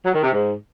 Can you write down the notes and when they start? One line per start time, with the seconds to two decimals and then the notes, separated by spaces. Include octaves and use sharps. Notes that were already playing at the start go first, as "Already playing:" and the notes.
0.05 F#3
0.14 D#3
0.23 C3
0.32 G#2